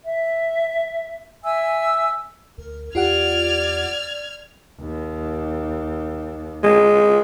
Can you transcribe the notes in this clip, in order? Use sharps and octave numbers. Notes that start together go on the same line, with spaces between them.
E5
E5 G#5 E6
D2 A#4
E2 F4 G4 D5 F#5 F6 G#6
D#2
G#3